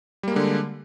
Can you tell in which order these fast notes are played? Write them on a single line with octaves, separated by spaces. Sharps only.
G3 A#3 G#3 D3